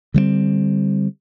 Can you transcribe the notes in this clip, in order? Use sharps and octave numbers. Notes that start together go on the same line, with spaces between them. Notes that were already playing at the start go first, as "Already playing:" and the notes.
D3 G3 A3 C4